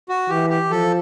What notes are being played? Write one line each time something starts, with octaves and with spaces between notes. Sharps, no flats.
F#4
E3 G4
G4
F3 A4